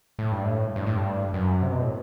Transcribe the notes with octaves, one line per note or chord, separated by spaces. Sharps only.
A2
G2
A2
G2
A2
G2
F#2
C3
B2
A2